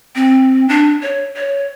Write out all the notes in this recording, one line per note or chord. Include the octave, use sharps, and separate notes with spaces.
C4
D4
C#5
C#5